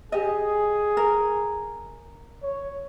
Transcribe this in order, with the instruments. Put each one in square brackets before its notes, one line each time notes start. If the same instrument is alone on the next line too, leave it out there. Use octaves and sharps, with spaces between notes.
[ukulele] G4 D#5 [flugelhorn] G#4
[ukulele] A#4
[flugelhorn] C#5